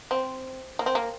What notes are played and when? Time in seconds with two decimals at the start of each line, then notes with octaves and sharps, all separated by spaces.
0.11 C4
0.79 A#3
0.86 C4
0.95 A#3